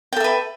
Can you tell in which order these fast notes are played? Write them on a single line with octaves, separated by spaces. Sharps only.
G5 A4 E5 B4